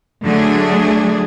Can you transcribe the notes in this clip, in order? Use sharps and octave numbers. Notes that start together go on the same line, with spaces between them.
D3 F#3 A3 D4 G#4